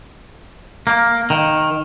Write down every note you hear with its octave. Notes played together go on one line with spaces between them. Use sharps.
A#3
D#3